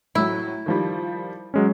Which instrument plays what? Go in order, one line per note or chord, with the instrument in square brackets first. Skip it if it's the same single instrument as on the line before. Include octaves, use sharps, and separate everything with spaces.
[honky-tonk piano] A2 F#3 [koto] E4
[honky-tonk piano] D#3 F3 G3
[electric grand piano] F#3 G#3 C#4